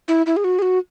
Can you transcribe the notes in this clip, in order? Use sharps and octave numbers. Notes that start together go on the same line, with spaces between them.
E4
E4
G#4
F#4
G#4
F#4